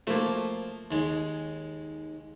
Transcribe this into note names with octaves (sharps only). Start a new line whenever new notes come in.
F3 A3 A#3
D#2 G#3